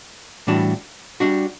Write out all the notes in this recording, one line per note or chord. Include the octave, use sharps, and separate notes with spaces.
A2 E3 G3 D4 F#4
G3 D4 F#4